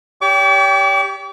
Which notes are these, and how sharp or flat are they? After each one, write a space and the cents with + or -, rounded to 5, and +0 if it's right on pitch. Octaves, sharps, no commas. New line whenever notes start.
G4 +0 C#5 +45 D6 -40